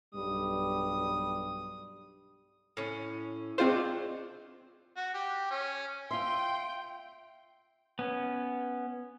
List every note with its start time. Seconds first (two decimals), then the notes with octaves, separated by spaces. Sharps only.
0.14 B1 G2 G3 D#6
2.77 A2 C#4
3.58 G#3 A3 C4 D4 F4 C5
4.97 F#4
5.14 G4
5.51 C#4
6.11 F4 E5 G5 C6
7.99 B3 C#4